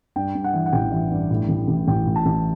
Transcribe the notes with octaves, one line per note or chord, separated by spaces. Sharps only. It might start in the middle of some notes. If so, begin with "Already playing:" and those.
G2 G5
G2
F#5
E3
F#5
A1 G5
E3
G2
A2
A1
A1
A1 G5
A2
A5
A1